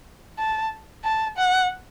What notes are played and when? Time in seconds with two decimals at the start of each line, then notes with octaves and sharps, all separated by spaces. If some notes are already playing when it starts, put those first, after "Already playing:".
0.39 A5
1.04 A5
1.38 F#5